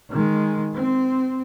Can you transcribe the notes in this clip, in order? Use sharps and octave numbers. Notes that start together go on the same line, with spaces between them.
D#3 G#3
C4